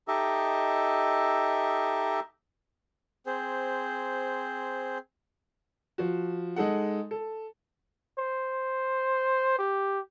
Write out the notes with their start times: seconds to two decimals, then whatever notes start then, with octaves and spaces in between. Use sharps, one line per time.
0.08 D#4 G4 A4 D#5 E5
3.26 C4 G#4 C5
5.98 F3 F#4
6.56 G#3 D#4 A4 F#5
7.11 A4
8.18 C5
9.59 G4